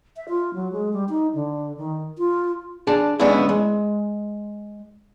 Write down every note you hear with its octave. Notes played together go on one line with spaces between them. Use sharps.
E5
F4
F#3
G#3
G3
D#4
D3
D#3
F4
D4 G#4 D5 A5
G#3 B3 C#4 D4 E4
G#3